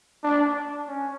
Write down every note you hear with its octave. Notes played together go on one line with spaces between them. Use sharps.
D4
C#4